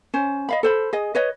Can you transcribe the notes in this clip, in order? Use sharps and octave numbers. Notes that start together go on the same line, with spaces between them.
C#4 C5
D#5 F5 B5
A4 C5 B5
G#4 D#5
B4 C#5 D#5